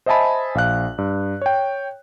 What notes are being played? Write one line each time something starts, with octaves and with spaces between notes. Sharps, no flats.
C5 D#5 E5 G#5 A5 B5
A#1 F5 F#6
G2
C#5 G5